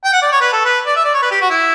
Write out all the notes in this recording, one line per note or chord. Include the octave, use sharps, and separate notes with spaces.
G5
F#5
D5
C#5
B4
A4
B4
D5
E5
D5
C#5
B4
G4
F#4
E4